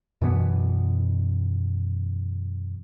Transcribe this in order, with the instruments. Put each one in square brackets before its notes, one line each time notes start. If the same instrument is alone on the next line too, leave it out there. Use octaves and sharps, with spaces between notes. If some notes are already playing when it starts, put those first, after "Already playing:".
[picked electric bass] F#2 B2 E3 B3